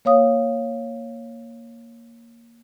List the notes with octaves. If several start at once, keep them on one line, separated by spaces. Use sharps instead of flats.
A#3 C#5 F5 D#6